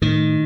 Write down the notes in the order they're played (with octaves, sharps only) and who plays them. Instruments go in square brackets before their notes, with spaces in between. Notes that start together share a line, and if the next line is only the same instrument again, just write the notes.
[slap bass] A2 D#3